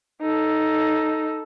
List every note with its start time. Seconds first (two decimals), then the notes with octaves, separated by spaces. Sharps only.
0.21 D#4 A4